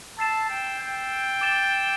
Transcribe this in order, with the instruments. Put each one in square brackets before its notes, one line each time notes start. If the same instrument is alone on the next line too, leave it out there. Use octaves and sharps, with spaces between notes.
[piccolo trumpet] A5 [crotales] E6 A6 C7 E7
[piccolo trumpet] G5
G5
[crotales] D6 A6 E7 G7